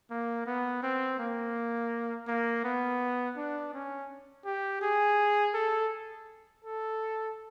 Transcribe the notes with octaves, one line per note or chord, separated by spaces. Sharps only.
A#3
B3
C4
A#3
A#3
B3
D4
C#4
G4
G#4
A4
A4